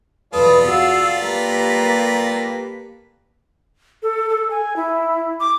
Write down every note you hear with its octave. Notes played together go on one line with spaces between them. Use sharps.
E2 B2 F4 A4 B4 D5 D#6
F#4 F5 E6
A#3 G4 B4 A#5
A4
A4
G#5
E4
D6